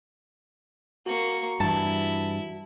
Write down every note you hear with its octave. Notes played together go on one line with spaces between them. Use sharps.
A#3 F#4 C#6
G2 E3 E4 A5